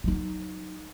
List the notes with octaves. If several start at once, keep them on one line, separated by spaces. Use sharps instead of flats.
F#3 D#4